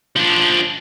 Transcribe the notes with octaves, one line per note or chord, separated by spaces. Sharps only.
F3 D4